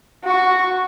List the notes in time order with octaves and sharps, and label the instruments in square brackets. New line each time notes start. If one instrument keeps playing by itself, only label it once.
[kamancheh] F#4 C#6